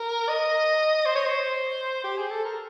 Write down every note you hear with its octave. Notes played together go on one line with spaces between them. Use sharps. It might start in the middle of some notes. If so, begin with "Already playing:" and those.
Already playing: A#4
D#5
C5
C#5
C5
G4
G#4
A4
A#4